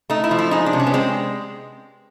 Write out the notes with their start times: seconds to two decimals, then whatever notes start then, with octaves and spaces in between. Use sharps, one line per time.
0.10 A3 D#4
0.24 E4
0.31 F3
0.39 E4
0.51 G#3 D#4
0.66 D4
0.73 C3
0.80 C#4
0.87 B3
0.93 G#3 C4